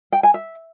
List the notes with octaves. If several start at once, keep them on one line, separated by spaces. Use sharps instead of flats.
G5
G#5
E5